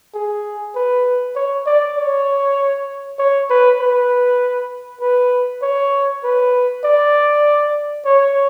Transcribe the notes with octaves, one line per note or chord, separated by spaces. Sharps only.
G#4
B4
C#5
D5
C#5
C#5
B4
B4
B4
C#5
B4
D5
C#5